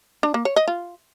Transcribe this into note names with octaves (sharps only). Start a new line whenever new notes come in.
D4
A#3
C#5
D#5
F4